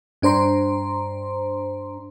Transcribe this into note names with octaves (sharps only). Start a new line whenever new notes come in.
G2 D4 C5 A#5 C6